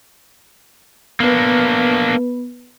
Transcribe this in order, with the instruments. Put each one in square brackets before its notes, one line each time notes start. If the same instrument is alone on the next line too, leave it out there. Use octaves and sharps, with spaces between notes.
[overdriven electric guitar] A#3 D4 [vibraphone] B3 B4